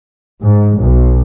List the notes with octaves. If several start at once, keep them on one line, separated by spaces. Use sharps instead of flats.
G#2
B1